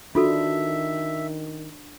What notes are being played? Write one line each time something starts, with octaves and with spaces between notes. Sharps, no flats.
D#3 D4 F4 F#4 A4 E5